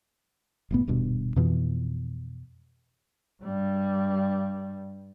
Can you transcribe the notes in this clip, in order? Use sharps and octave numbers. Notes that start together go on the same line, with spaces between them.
F#1 A2 B3
D#1 G2 B2
F2 B2 E3
G2 G3